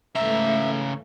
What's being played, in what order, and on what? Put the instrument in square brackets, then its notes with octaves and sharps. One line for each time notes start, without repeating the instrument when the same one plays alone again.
[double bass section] G#2 E3 A3 [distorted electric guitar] C#3 A#5 [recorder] E5